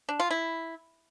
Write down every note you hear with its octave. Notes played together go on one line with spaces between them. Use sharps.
D4
F4
E4